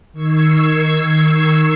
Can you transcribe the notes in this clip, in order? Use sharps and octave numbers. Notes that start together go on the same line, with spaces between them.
D#3 C#6 E6 G#6 C7